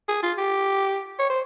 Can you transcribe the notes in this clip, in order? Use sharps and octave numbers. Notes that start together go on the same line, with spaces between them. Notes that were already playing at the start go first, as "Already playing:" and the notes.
G#4
F4
G4
C#5
C5